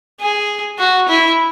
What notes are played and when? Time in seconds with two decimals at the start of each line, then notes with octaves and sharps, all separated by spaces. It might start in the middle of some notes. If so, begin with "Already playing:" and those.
0.20 G#4
0.79 F#4
1.08 E4